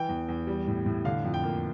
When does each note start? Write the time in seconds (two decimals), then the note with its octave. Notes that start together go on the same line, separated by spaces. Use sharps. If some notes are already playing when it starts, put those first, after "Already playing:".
Already playing: E3 G5
0.09 E2
0.29 E2
0.47 G3
0.67 A2
0.86 A2
1.05 D3 F5
1.25 F2
1.34 G5
1.44 A#3